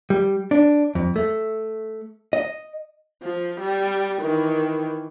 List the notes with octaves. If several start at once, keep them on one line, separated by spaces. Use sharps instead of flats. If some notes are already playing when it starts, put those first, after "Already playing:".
G3
D4
F2
A3
D#5
F3
G3
D#3 E3